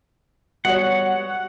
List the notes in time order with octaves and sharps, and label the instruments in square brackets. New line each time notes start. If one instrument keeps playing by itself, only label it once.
[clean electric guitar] G3 B3 D#5 [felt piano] F#4 C#5 [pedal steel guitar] F#5